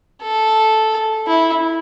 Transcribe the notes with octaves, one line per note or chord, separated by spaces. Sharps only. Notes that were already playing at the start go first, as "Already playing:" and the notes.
A4
E4